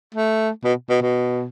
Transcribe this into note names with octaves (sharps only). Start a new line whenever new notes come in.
A3
B2
B2
B2